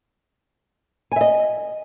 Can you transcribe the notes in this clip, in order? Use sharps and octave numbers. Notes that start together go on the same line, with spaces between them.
D#5 E5 G#5